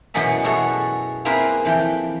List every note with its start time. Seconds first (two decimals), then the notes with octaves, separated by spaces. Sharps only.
0.14 F#2 B2 E3 F#3 G#4 E5
0.44 E4 F#4 G#4 A4 C#5
1.25 A#3 C4 E4 G#4 A#4 B4
1.65 F2 E3 G5